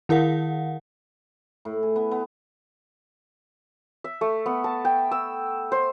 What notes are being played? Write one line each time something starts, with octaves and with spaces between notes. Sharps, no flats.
D#3 E4 A#4 F5 F#5
A2
G#4
B3
B3
E5
A3
B3
A5
G5
E6
C5